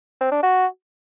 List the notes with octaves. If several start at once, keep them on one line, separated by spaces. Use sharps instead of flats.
C4
D4
F#4